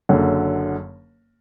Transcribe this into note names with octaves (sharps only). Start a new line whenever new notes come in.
F#1 F#2 D3